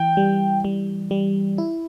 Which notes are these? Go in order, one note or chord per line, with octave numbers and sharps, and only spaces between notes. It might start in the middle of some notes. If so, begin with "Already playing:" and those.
Already playing: E3 G5
G3
G3
G3
E4